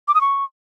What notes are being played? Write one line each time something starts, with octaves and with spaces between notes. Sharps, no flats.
D6
D#6
C#6